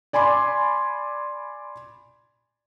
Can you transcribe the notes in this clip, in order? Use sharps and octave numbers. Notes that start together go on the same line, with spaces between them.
D5 G#5 B5 C6 D6